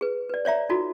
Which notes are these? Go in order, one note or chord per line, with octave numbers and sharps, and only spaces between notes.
G#4 B4
B4 D5
C#5 D5 E5 A#5
D#4 F4 F#4 A4 A#5